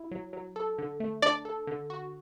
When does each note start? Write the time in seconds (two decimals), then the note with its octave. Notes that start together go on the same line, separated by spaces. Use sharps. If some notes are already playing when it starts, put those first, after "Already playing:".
Already playing: E4
0.11 F#3
0.33 F#3
0.56 A4
0.78 D3
1.00 A3
1.22 D4 D5
1.45 A4
1.67 D3
1.90 F#4